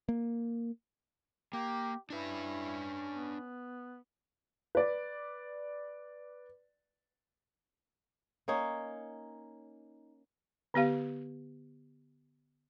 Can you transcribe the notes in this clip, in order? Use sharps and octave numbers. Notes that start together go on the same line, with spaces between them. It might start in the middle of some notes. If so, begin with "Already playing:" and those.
A#3
A#3 G4
C#4 D4 E4 B4
B3
B4 D5
A#3 C#4 D#4 C#5
D3 B3 G4 F5